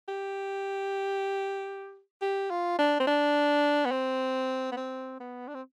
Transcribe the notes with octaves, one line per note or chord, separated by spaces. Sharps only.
G4
G4
F4
D4
C4
D4
B3
C4
B3
C4
B3
D4
C4